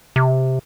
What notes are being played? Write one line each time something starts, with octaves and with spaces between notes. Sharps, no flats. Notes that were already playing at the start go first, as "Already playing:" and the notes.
C3